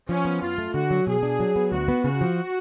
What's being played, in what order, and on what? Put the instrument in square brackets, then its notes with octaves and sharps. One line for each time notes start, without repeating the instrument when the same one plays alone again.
[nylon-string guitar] F3 [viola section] C#4
[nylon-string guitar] B3
[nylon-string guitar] F#2 [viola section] F4
[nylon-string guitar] A3
[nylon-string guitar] D3 [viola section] F#4
[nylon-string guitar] F#3
[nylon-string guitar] B2 [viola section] G#4
[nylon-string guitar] D4
F#3
B3
[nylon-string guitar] D2 [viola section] F#4
[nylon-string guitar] B3
[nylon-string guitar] C#3 [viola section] F#4
[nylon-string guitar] F3